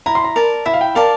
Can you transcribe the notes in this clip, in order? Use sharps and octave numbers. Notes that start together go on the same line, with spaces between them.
E4 A#5
C6
A#5
A#4 D5 A5
E4 E5
F5
G5
A#4 D5 F5 A5